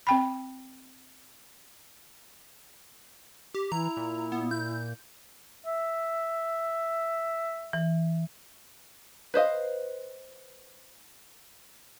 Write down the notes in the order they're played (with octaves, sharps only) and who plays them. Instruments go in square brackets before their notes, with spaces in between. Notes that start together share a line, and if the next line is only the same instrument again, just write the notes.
[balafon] C4 G5 B5
[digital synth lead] G4
[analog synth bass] E3 [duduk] E4 [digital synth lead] A#5
[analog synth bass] A#2
[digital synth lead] B3
G6
[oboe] E5
[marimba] E3
[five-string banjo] B4 C5 D#5 F5